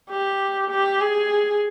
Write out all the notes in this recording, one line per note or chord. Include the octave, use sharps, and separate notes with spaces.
G4
G4
G#4